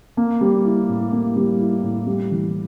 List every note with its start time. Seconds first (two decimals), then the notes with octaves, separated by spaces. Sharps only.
0.17 A#3
0.41 G3
0.65 E4
0.88 A2
1.12 A#3
1.36 G3
1.60 E4
1.83 A2
2.06 G3
2.31 E3